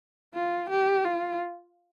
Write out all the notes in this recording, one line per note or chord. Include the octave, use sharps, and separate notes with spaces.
F4
G4
F4